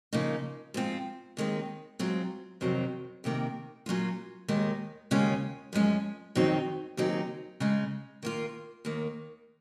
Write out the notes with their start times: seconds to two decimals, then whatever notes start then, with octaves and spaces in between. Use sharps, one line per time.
0.13 C#3 F3 A#3 D#4
0.74 G#2 F3 C4 F4
1.37 D#2 D#3 G#3 C4
1.99 G#2 F#3 C4 F4
2.61 F2 C3 D#3 F#3 C4
3.24 F2 C3 D#3 A#3
3.86 A#2 F#3 C#4 F4
4.48 D#2 D#3 G#3 D#4
5.11 D#2 C#3 G#3 C#4 F4
5.73 F#2 F3 G#3 C#4
6.35 F2 D#3 F#3 C4 D#4
6.97 D#2 C#3 F#3 C4 D#4
7.60 C#3 G#3 D#4
8.23 D#3 A#3 F4
8.85 D#2 D#3 A#3